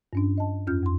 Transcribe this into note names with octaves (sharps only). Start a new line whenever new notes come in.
G2 C#4 D4
D#5 A5
F2 C#4 F4 F6 G6
F2 C6